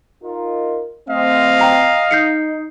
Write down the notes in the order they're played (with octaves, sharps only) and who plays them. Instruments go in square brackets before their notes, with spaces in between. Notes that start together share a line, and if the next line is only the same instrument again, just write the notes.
[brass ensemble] D#4 F4 A#4
[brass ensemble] F#3 A3 C4 [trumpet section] D#5 F5
[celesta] G5 A#5 C7
[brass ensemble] D#4 [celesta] G6 C7 C#7